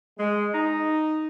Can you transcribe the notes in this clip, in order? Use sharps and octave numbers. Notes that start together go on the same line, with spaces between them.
G#3
D#4